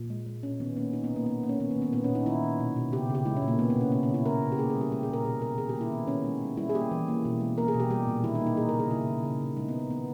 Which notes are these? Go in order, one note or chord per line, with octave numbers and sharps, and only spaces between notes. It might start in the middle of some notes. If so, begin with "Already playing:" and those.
Already playing: A#2
G#3
G#3
B2 C#4
D#3 B3
A#3 C#4
A#3 D#4
B3
B2
A#3
A#3 B3
A#3
C#4
D#3 B3
A#3
D#3
B3
A#2 B3
C#4
A#2
D#4
D#3 E4
D#3
B2
B2
C#3 G4
C#3
G4
G#3 E4
C#4
A#2
A#3
A#3 B3
B3
B2 C#4
C#3 B3
C#4
C#3 E4
C#3 A#4
C#3
G4
A#3 G#4
G#4
G3
G4
G#3 G4
G#4
A#2 A#4
B2 G#4
B2 A#4
D#3 G#4
G4
A#3
E4
D#3 B3
D#3 C#4
G#3
G#3
G3 E4
G#4
A#3 G4
E3
A#3
B2
G#3
A#3 A#4
G#4
B2
G4
G3 G4
A#2
D#3 E4
D#4
A#3
D#4
A#3 G#4
A#4
C#3
G#4
C#3 E4
C#3
C#3
C#3
G#3 D#4
B3
G#3
B3
D#3 B3